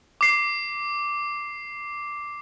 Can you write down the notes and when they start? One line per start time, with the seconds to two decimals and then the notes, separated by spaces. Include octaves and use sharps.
0.21 D6 C7